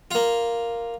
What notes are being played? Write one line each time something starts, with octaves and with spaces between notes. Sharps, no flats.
A#3 F4